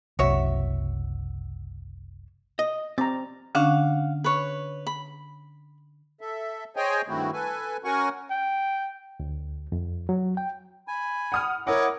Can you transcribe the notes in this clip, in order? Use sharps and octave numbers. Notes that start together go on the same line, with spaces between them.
F#1 C2 F#4 C#5 E5
D#5
C4 D5 A#5
D3 C#4 D4 F5 F#5
B4 C#5
B5
A4 E5
G#4 C5 C#5 D#5 G5 G#5
G2 D#3 A3 C4 E4 F#4
A4 B4 G#5
C#4 F#4 A#4 F#5 G#5 C#6
G5
D2
F2
F#3
G5
G#5 B5
F#5 D#6 F6
E4 A#4 C#5 D#5 F#5 D6